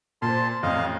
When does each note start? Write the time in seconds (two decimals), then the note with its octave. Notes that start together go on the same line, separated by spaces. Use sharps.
0.22 A#2 C5 A5 C6
0.63 A1 F2 D#5 F5